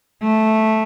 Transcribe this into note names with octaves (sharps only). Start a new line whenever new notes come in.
A3